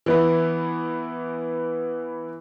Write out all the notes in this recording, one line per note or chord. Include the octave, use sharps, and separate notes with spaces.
E3 B3 E4